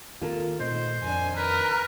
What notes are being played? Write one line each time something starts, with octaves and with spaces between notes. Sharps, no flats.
D#3 A#3 C4 F4 A4 A#4
A#2 A3 C4 D#4 C5
F2 D#3 D4 G#5
A#4 B4